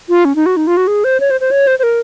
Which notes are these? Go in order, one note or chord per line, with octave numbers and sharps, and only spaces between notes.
F4
C#4
D#4
F#4
D#4
F4
F#4
G#4
C5
C#5
C5
C5
C#5
C5
C5
A#4